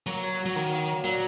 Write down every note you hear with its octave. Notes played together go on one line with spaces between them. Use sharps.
F#3 A#3
C#5
F#4
F#3
D#3 A#3
A#3
C#5
A#2 F#3